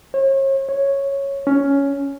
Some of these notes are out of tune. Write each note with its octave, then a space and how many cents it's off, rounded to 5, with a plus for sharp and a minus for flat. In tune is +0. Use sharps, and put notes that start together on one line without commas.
C#5 -40
C#5 -5
C#4 +10